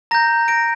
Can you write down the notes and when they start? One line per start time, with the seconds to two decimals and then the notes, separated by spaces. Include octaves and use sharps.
0.11 A#5 G6 A#6
0.48 A#6 D7